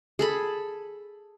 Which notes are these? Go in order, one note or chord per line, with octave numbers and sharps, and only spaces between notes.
G#4 A4 B5